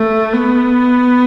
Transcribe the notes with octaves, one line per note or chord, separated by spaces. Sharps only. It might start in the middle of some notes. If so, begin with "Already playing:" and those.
Already playing: A3
B3